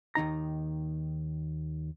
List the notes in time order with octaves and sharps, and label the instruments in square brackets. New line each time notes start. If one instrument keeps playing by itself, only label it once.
[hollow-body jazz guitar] D#2 D#3 D#4 A#5